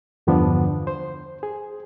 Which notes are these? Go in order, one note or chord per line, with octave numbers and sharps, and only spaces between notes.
E2 G2 D3 F3 B3 D4
C5
G#4